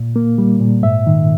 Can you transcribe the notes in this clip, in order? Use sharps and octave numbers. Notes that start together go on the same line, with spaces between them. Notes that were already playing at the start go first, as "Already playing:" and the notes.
Already playing: A#2
A#3
G3
A#2
G#2 E5
D#3